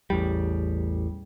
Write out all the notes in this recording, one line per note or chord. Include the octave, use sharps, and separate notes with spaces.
A1 E2 G3